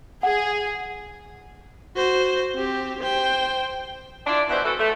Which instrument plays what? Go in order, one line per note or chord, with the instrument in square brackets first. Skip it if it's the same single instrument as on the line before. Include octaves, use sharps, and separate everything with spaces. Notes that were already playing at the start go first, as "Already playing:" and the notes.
[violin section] G#4 [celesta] F#5
[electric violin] F#4 C5
C4 G4
C5 G5
[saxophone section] D4 E4 F4 D5
B2 E3 G3 C5 E5 F#5
E3 F#4 A4
A3